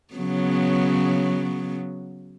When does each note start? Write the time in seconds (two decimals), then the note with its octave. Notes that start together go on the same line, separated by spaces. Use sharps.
0.14 C#3 F#3 B3